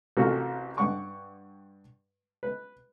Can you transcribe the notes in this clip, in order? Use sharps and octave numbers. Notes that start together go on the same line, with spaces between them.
A1 C3 F4 F#4 A4 A#4
G2 F#5 C#6 D6
B4